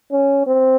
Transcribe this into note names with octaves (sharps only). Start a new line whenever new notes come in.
C#4
C4